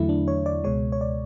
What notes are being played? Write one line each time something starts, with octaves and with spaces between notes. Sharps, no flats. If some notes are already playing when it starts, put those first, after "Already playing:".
Already playing: E2 D3 F#3 A3 E4
D4
C#5
D5
C#2 B2 G#3 C#5
C#5
D5